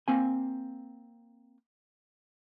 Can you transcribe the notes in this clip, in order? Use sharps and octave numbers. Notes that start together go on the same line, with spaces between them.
A#3 C4 G#5